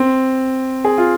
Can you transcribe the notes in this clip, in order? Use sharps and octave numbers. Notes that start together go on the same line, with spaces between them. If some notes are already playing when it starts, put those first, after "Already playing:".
Already playing: C4
G#4
F4